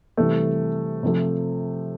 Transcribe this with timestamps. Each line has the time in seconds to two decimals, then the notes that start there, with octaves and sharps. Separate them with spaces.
0.17 C3 E3 G3 A3
1.03 C3 F3 A3